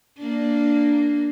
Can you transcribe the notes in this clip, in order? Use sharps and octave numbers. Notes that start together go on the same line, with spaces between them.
A#3 D4